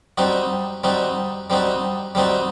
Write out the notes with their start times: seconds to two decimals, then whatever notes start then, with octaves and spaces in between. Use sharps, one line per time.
0.18 G3 C4 D#4 F#4
0.84 G3 C4 D#4 F#4
1.50 G3 C4 D#4 F#4
2.15 G3 C4 D#4 F#4